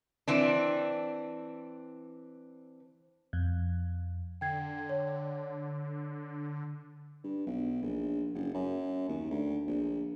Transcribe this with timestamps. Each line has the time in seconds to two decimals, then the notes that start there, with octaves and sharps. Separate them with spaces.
0.28 E3 C4 D4
3.33 F2
4.41 D3 G5 G#6 C7
4.89 C#5
7.24 G2
7.46 B1
7.82 A#1
8.34 F#1
8.54 F#2
9.09 D#2
9.31 D2
9.67 A#1